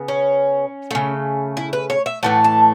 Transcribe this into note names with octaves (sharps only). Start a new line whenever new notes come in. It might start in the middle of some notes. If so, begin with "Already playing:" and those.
Already playing: C#3 B3
C#4
C#3 A3
E4
B4
C#5
E5
A2 E3 A3 F#5
A5